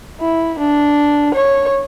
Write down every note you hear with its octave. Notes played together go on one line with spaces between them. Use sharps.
E4
D4
C#5